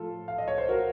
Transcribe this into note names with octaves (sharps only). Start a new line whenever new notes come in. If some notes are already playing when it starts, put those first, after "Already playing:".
Already playing: A2 F3 A3 F4 A4
F5
D#5
C#5
C5
F#4 A#4